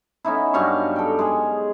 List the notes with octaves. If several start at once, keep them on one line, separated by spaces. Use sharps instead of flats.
B3 C#4 D#4 E4
G2 F#3 F5 C#6
A4 G5
G#3 G#4